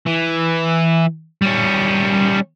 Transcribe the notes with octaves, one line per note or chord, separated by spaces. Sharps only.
E3
G3 C#4